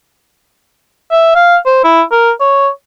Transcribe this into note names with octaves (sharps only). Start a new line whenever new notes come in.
E5
F5
C5
E4
A#4
C#5